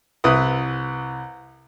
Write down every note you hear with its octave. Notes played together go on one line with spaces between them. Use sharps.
C2 E4 B4 D#6